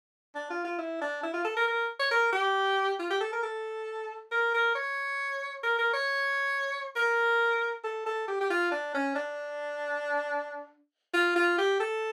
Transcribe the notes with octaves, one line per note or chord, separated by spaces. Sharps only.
D4
F4
F4
E4
D4
E4
F4
A4
A#4
A#4
C#5
A#4
G4
F4
G4
A4
A#4
A4
A#4
A#4
C#5
A#4
A#4
C#5
A#4
A4
A4
G4
G4
F4
D4
C#4
D4
F4
F4
G4
A4